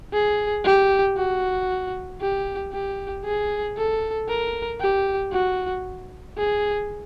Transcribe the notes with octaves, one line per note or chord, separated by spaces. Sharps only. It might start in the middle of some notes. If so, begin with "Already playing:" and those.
G#4
G4
F#4
G4
G4
G#4
A4
A#4
G4
F#4
G#4